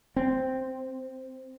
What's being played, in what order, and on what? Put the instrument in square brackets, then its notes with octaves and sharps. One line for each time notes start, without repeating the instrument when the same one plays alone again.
[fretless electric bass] C4